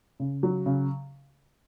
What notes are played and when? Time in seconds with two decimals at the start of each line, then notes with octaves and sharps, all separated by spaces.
0.20 C#3
0.43 F#3
0.66 C#3